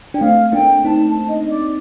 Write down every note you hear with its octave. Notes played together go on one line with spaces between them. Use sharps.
D4 G5
A3 C4 F5
A#3 D4 G5
C4 D#4 A5
A5
D#5
D5